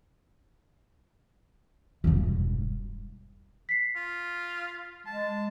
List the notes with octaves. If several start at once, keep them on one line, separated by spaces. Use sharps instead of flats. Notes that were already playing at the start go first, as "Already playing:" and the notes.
E1 G2
B6 C7
F4
G#3 A5